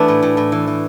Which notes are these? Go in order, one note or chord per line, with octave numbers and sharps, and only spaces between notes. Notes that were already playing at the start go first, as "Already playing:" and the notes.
Already playing: E3 A3 B3 D4
A2
A2
A2
E3
E3